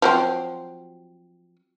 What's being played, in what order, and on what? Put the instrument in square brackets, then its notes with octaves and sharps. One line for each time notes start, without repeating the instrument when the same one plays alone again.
[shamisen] F3 F#3 C4